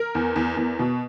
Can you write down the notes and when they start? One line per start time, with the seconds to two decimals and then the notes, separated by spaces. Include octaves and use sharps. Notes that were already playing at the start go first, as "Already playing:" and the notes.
Already playing: A#4
0.15 E2
0.36 E2
0.57 E2
0.79 B2